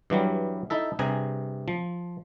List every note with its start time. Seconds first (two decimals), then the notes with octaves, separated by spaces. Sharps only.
0.10 G2 E3 F#3 G3
0.70 D#4 E4 A4 E5
0.99 G2 C3 G#4 G#5 A#5
1.68 F3